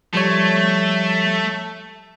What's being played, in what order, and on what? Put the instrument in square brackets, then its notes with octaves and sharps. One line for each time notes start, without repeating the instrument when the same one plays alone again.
[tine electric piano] F3 G3 C#5 [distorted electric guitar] A3